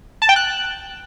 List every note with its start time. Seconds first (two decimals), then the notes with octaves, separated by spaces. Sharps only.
0.22 A5
0.29 G5
0.36 F#6